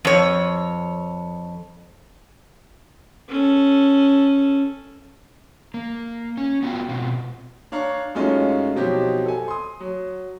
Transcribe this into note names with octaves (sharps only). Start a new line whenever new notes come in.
F2 C#5
C#4 A4
A#3
C#4
B3 D4 F4 F#4 F5 G5
B2 C4 F4
D4 C#5 F5 A#5 C#6
F#2 G#3 A3 C#4 D#4 F4
B2 F3 F#3 C4 D#4 G4
A4 G#5
C6 D#6
F#3